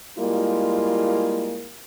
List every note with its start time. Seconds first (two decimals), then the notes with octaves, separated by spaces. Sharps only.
0.18 G3 G#3 A#3 E4 F4